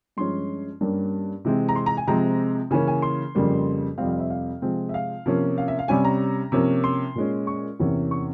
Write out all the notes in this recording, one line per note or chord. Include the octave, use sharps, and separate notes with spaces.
G2 F3 G#3 C#4 C6
G2 G3 A#3 C#4
C3 E3 G#3 C4
A#5
C6
A#5
G#5
C3 F3 G#3 C4 A#5
C#3 E3 A#3 C#4 G#5
G#5
C6
F2 C#3 G3 A#3
F2 C3 G3 C4 F5
F5
E5
F5
C3 F3 G#3 C4
E5
F5
C3 F3 A#3 C#4
F5
E5
F5
C3 G3 C#4 G#5
A#5
C3 F3 A#3 C#4
C6
A#2 G#3 C#4
C#6
E2 C3 E3 A#3 C#4
C#6